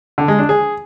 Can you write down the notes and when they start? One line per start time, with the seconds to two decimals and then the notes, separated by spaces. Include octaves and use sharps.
0.18 D3
0.28 G#3
0.39 D4
0.49 G#4